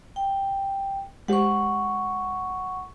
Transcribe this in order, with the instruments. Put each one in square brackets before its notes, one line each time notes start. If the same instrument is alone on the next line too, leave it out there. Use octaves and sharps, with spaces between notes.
[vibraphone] G5
[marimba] G#3 G4 C5 [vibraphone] F#5 C#6